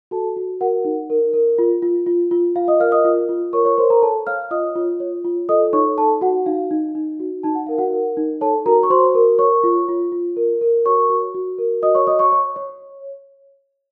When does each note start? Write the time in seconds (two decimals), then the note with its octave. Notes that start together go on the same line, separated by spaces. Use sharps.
0.11 F#4 A4 A5
0.37 F#4
0.61 F#4 A#4 F#5
0.85 D#4
1.10 A#4
1.33 A#4
1.58 F4
1.82 F4
2.06 F4
2.31 F4
2.55 F4 F5
2.68 D#5 D#6
2.80 A#4 F5 F6
2.92 D#5 D#6
3.05 F4
3.29 F4
3.53 A#4 C#5 C#6
3.65 C#5 C#6
3.77 A#4 C5 C6
3.90 A#4 A#5
4.02 A4 C#5 A5
4.27 C#5 F5 F6
4.51 F4 D#5 D#6
4.75 F4
5.00 C#5
5.25 F4
5.49 A4 D#5 D#6
5.73 D#4 C#5 C#6
5.97 A4 A5
6.21 F#4 F#5
6.46 D#4 F5
6.71 D#4
6.95 D#4
7.20 F#4
7.43 D#4 A5
7.55 F#5
7.66 A#4 F5
7.78 F#4 F#5
7.93 A#4
8.17 D#4
8.41 A4 C#5 A5
8.66 F#4 A#4 A#5
8.83 C#6
8.90 F#4 C5 C6
9.15 A#4
9.39 C#5 C#6
9.64 F4
9.88 F4
10.12 F4
10.37 A#4
10.61 A#4
10.85 F#4 C#5 C#6
11.10 F#4
11.34 F#4
11.58 A#4
11.82 F#4 D#5 D#6
11.95 C#5 C#6
12.07 C#5 D#5 D#6
12.19 C#5 C#6
12.32 C#5
12.56 C#5